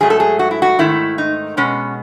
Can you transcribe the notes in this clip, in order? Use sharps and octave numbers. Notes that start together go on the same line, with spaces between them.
G#2 F#3 A3 G#4
A4
G#4
F#4
E4
F#4
G#2 D#3 A3 E4
D#4
B2 G#3 B3 C#4